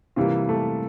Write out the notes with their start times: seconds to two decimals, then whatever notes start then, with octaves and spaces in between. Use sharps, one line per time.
0.16 C3 E3 G3 A#3 F4
0.49 A3 A4